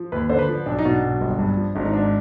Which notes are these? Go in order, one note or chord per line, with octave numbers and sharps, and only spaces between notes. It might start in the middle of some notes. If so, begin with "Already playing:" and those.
Already playing: F3
D#2 B4
D3 C5
B4
F3
B1 D4
D#4
B2 D4
B1
G1
G2
F3
G#1 D4
D#4
G#2 D4